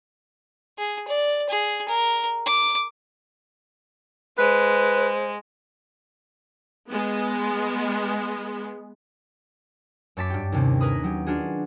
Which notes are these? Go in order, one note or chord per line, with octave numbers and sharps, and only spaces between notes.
G#4
D5
G#4
A#4
D6
G#3 B4 C5
G#3 B3
F#2 C#5 A5 D6 B6
G2 G4
D#2 C3 C#4
G#4 A#4 B4 B5 D#6
F#3 G4
D4 F4 F#4 G#4